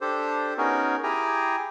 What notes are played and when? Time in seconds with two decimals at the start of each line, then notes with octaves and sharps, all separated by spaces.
0.01 D4 G4 A4 C5
0.58 B3 C#4 D#4 F#4 G#4 A#4
1.03 E4 G4 G#4 G5 G#5 A#5